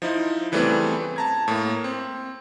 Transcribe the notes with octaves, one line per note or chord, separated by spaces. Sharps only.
F3 D#4 E4
C#3 E3 G3 A3 B3 C4
A5 A#5 G#6
A2 A#3
C4